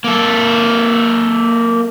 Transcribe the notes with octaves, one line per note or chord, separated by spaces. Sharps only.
A#3 A4